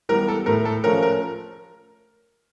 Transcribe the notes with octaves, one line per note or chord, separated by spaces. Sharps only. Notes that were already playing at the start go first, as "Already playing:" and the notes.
E3 G3 B3 A#4
A4
A2 A#4
A4
F3 A3 C#4 A#4
A#4